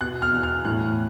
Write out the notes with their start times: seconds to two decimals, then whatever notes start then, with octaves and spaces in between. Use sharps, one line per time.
0.01 B2 F#6
0.22 F6
0.33 E2
0.43 F6
0.65 A2 F#6